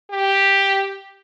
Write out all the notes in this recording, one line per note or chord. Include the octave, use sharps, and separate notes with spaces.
G4